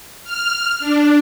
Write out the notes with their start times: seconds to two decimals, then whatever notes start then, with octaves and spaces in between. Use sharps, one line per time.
0.24 F6
0.79 D4